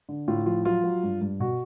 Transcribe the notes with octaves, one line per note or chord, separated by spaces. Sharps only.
D3
A2 F4
F3 F4
F#3 F4
F#3
G2
G2
B2 F#4